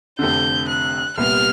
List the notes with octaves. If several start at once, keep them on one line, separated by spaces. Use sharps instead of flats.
F1 F2 D3 G6
F#6
C2 A#2 G3 B3 F6